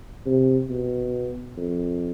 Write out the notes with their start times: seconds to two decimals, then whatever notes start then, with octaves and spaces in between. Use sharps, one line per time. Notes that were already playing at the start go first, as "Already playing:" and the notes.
0.26 C3
0.70 B2
1.57 F2